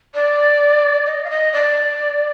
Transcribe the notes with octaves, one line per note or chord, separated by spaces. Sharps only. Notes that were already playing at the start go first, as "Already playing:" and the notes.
D5
D#5
F5
D#5
D5